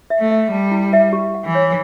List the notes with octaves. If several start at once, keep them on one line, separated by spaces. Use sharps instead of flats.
E5
A3
E5
G3 A5
E4
E5
G4
F#5
E3
C#5